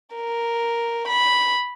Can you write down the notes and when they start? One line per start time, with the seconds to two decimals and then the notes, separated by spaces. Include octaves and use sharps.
0.15 A#4
1.08 B5